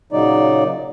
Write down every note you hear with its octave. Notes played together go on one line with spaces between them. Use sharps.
A#2 C#3 F#3 D#4 D5